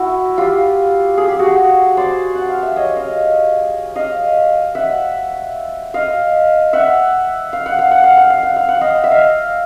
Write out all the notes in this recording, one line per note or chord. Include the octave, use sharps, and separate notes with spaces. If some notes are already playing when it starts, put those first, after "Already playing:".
Already playing: E4 F#4
F4 G4
G#4
G4
F#4 G#4
C5 D5
F#5
F5
E5
C#5 D#5
D#5 F5
D#5 F5
E5 F#5
D#5 F5
E5 F#5
F5
F#5
F5
F#5
F5
F#5
F5
F#5
F5
F#5
D#5 F5
E5
D#5 F5